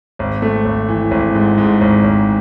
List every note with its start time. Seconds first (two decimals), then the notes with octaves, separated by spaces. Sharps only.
0.19 G#1
0.42 A3
0.65 G#1
0.89 E3
1.11 G#1
1.35 G#2
1.58 G#2
1.81 G#1
2.04 G#1